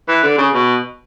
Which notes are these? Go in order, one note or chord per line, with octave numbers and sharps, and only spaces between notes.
E3
D3
C#3
B2